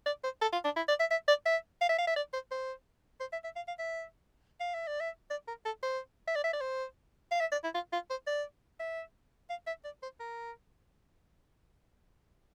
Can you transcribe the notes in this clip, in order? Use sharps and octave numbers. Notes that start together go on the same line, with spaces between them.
D5
C5
A4
F4
D4
E4
D5
E5
E5
D5
E5
F5
E5
F5
E5
D5
C5
C5
C5
E5
E5
F5
F5
E5
F5
E5
D5
E5
D5
A#4
A4
C5
E5
D5
E5
D5
C5
F5
E5
D5
E4
F4
F4
C5
D5
E5
F5
E5
D5
C5
A#4